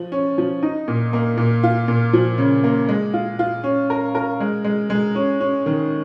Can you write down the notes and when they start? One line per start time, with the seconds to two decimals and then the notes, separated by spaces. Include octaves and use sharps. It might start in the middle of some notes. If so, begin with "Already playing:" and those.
Already playing: F3
0.12 C#4
0.38 F3
0.63 D#4
0.88 A#2
1.13 A#3
1.37 A#2
1.63 F4
1.88 A#2
2.13 F3
2.38 C#3
2.64 A#3
2.89 G#3
3.14 F4
3.39 F4
3.64 C#4
3.90 A#4
4.15 A#4
4.40 G#3
4.64 G#3
4.90 G#3
5.15 C#4
5.40 C#4
5.66 D#3